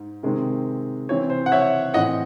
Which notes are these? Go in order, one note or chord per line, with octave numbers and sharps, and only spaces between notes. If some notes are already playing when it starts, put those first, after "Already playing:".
Already playing: G#2
C3 D#3 G#3 C4
C3 E3 C4 C#5
C5
F#5
C#5 E5
A2 E3 C4 D#5 F#5